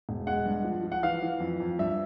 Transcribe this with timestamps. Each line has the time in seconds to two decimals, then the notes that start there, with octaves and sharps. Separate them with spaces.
0.09 E1
0.27 G#3 F#5
0.45 G2
0.64 F3
0.83 F3
0.92 F#5
1.03 E3 F5
1.22 E3
1.40 F2
1.60 F2
1.79 G2 E5